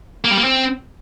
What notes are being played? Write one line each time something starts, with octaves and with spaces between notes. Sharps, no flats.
A#3
G3
A#3
C4